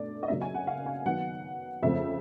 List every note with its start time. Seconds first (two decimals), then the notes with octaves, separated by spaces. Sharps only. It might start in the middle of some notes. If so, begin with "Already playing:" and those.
Already playing: B2 A3 D4 D5
0.23 D#5
0.28 C#3 F#3 A#3 C#4 E5
0.41 G#5
0.54 F#5
0.67 F5
0.86 G#5
1.06 D#3 F#3 B3 F#5
1.83 F2 C#3 F3 A3 C4 E5